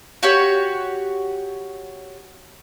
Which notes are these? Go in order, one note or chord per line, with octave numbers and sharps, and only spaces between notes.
F#4 G4 C#5